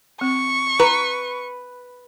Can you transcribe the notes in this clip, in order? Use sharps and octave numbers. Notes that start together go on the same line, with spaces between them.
C4 C#6
B4 A#5